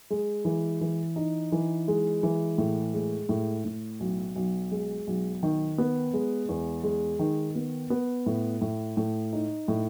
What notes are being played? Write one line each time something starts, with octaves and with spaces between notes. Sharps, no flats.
G#3
E3
E3
D#4
E3
G#3
E3
A2
G#3
A2
A2
B1
B1
G#3
B1
D#3
B3
G#3
E2
G#3
D#3
B3
B3
A2
A2
A2
D#4
A2